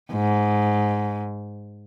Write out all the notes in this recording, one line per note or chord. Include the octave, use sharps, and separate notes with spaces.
G#2